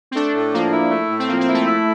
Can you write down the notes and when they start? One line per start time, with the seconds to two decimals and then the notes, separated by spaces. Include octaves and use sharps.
0.11 C4
0.15 A3 D4
0.34 A2
0.53 F3 A#3
0.72 E4
0.91 A3
1.10 A2
1.19 C4
1.28 F3 A#3
1.41 C4
1.47 E4
1.54 A3
1.67 E4